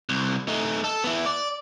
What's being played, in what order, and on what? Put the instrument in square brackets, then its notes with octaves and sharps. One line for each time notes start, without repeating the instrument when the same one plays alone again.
[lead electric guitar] C2
A3 D#4
A4
B3 E4
D5